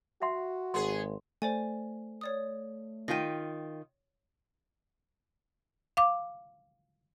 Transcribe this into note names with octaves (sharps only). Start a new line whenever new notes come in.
F#4 E5 F#5 C6
G#1 B3 G#4 C6
A3 C5 D5 G#5
C#5 D5 D#6
D#3 F4 G5 A#6 D#7
F5 D6